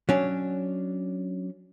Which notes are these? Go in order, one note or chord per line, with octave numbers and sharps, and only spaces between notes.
F#3 C#4 D4